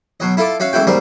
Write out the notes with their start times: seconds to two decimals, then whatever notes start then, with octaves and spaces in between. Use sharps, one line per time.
0.20 B2 F#3 D#5
0.37 E4 F4 A4 A5 D6
0.60 C#4 F#4 E5 F5
0.73 A1 G#2 E4 F#4 G5
0.87 B1 G#2 G3 C4 A#4